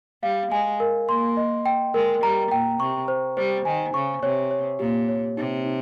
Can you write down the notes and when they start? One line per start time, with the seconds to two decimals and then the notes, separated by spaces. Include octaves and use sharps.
0.23 G3 F5
0.51 G#3 G#5
0.80 A#4
1.09 A#3 C6
1.37 D#5
1.66 G5
1.94 G#3 A#4
2.22 G3 A#5
2.51 A#2 G5
2.80 C3 C#6
3.08 C5
3.37 G3 C5
3.65 D#3 G#5
3.94 C#3 C#6
4.23 C3 C#5
4.51 C#5
4.79 A#2 G4
5.09 C#5
5.37 C3 D#4
5.65 D#4